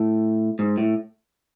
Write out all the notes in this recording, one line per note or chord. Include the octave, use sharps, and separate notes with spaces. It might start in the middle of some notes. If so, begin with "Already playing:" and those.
Already playing: A2
G#2
A2